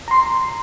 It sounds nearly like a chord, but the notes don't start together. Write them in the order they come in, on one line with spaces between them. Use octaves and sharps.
A#5 C6 C7